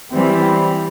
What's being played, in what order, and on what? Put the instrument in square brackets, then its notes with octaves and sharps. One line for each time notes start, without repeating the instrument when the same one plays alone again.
[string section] E3 G3 C4